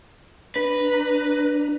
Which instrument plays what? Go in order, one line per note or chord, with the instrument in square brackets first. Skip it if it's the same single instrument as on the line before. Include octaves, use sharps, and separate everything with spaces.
[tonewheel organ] D4 A#5 [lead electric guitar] B4